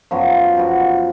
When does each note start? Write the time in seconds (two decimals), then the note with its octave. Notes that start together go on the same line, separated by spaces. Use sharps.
0.11 F#2 F3 B3 F#4
0.56 F#2 F3 B3 F#4